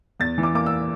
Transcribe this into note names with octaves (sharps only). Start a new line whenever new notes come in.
E2 A6
E3
D6
A#3 D6
E6